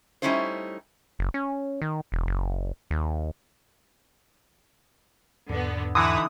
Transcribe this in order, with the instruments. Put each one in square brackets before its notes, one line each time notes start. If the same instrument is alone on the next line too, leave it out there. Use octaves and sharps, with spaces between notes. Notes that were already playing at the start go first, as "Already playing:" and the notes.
[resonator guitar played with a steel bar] G3 A3 C#4 D#4 E4 C5
[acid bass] F#1
C#4
D#3
E1
F#1
D#2
[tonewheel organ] E2 G#2 [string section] D3 B3
[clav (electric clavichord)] D3 E3 [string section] D#4 E4 [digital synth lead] D#6